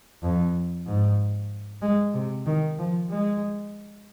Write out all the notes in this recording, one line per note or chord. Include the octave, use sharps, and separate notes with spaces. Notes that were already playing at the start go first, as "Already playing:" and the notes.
F2
G#2
G#3
C3
D#3
F3
G#3